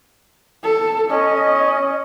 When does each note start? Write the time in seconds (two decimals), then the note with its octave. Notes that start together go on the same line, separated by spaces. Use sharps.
0.64 A4
1.11 C#4 D#5